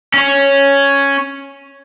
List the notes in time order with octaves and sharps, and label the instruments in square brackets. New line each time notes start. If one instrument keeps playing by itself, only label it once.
[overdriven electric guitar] C#4 C#5